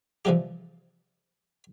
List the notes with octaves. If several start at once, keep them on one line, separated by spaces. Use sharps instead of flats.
C3 E3 F3 G3 G4